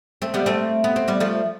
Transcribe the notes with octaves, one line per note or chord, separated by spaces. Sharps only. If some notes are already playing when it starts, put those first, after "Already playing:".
A3 C4
G3 B3
A3 C4
B3
C4
G3 B3
F3 A3